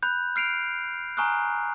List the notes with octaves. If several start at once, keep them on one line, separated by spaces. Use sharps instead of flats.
B5 F#6 G6
F6 C7 D7 F7
G#5 A#5 C#6 D#6 F6 F#6